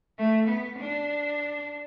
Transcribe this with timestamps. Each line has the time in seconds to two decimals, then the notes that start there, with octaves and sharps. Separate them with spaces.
0.18 A3
0.48 B3
0.79 D4